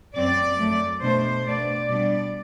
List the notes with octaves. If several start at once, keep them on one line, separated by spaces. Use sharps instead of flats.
F#2 F#3 C4 D5
F#2 F#3 A3
B2 A3 D4 C5
B2 A3 D4 D5
B2 G3 B3 D4 D5